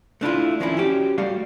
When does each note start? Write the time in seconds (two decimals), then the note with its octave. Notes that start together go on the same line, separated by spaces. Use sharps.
0.21 A3 D4 E4 F4
0.60 D#3 F3 A#3 C#4 D4 E4
0.77 C#4 F#4 G4
1.18 G3 A3 F#4 D5 F5